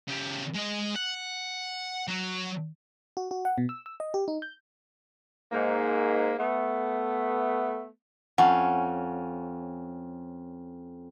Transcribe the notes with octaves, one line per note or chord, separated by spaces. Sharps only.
C#3 G4
G#3 D#5
F#5
F#3 F#4
F#4
F#4
F#5
B2
E6
E6
D#5
G4
D#4
G6
G#2 A#3
A3 B3
F2 C#4 F#5